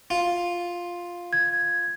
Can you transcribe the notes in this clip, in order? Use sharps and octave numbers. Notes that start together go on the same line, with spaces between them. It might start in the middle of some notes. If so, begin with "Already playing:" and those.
F4
G#6